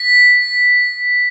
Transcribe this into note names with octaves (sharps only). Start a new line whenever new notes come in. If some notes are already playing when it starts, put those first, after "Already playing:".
Already playing: B6